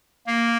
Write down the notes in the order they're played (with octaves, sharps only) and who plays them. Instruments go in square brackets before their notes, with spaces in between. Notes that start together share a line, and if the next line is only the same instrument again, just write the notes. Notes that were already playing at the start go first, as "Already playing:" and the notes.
[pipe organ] A#3